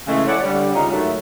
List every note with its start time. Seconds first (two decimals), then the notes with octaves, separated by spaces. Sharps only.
0.07 C#3 E3 G#3 A3
0.27 E4 A4 C#5 D5 F#5
0.42 D3 G3
0.74 C#3 G#3 C#4 D#4 F4
0.91 G#2 D#3 F#3 A3